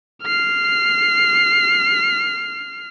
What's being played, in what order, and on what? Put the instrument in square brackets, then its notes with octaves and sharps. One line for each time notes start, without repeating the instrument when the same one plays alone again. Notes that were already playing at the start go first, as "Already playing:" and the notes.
[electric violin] F6 C7